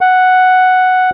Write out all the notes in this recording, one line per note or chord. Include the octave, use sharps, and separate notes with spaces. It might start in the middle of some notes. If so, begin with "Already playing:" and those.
F#5